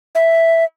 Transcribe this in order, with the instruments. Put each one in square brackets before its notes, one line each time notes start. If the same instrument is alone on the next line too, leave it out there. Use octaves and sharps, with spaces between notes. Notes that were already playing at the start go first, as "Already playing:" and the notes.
[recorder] E5